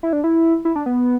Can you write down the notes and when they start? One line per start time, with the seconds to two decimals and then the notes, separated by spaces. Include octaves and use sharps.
0.03 E4
0.13 D4
0.24 E4
0.65 E4
0.76 D4
0.86 B3